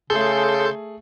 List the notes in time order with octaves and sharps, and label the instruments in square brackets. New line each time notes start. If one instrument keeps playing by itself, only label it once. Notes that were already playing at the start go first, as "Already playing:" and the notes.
[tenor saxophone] C#3 [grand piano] A3 G#4 [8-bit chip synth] A4 C6 G6